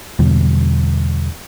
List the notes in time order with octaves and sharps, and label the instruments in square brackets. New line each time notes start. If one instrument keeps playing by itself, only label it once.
[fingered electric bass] E2 B2 D3 G3